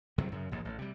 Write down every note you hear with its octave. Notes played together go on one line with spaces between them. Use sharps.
E2 C3 F#3 G3
F#2 C#3
A#1 D#2 G#2
A1
C3 G3